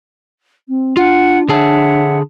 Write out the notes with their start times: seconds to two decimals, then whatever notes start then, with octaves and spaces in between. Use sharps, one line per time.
0.68 C4
0.97 D4 F4 F#5
1.49 D3 G#4 C#5 E5 F#5 A5